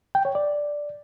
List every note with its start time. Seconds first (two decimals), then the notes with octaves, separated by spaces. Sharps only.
0.15 G5
0.25 C#5
0.35 D5